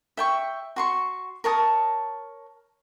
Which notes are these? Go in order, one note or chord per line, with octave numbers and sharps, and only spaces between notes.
E5 G5 C#6
F#4 C6 C#6
A#4 C#5 A5 D#6